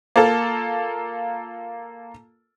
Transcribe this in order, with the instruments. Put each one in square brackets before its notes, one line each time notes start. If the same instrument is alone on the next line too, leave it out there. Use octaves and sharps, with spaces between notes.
[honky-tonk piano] A#3 F4 A4